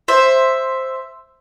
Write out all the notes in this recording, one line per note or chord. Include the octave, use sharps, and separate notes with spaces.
C5 E5